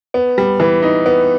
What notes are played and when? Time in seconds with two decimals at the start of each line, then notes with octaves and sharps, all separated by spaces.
0.14 B3
0.38 G3
0.60 E3
0.82 D#4
1.06 B3